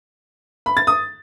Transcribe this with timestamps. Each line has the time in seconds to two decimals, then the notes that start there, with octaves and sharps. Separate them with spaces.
0.66 B5
0.77 A6
0.87 D#6